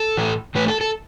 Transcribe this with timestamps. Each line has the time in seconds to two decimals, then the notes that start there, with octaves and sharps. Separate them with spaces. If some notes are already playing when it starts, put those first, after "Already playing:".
Already playing: A4
0.17 A2 E3 A3
0.55 A2 E3 A3 B4
0.68 A4
0.81 A4